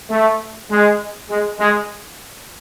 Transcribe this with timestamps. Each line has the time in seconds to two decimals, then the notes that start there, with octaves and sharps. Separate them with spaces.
0.10 A3
0.70 G#3
1.30 G#3
1.60 G#3